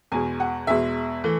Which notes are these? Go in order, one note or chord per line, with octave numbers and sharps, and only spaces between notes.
E2 B2 G#3 G#5
F#5
E2 B2 G#3 E5
E3 A3